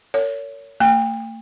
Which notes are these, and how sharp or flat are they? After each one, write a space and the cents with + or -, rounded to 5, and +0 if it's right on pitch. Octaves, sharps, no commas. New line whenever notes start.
A#4 -35 C#5 +30
A3 +45 G5 +35